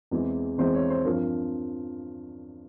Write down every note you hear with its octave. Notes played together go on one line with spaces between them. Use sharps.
E2 E3 G#3 C4
E2 E3 G#3 C4 C5
C#5
C5
G2 F3 C4 A#4